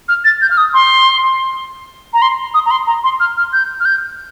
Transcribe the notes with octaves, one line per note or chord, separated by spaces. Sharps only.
F6
A6
G6
F6
D#6
C6
A#5
C6
D#6
A#5
C6
A#5
C6
F6
F6
G6
F6
G6